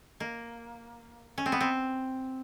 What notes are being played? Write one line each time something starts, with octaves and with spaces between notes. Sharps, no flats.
A#3
C#4
C4
B3
C4